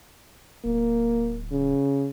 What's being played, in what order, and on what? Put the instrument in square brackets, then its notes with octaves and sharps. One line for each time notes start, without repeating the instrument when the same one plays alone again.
[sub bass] D1 [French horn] A#3
[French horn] C#3